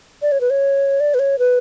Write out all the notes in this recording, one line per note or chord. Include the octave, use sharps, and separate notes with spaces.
D5
C#5
B4
C#5
D5
B4
C#5
B4